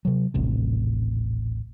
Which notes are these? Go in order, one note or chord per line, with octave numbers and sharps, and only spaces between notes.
C3 F#3
D#1 A1 A2 C3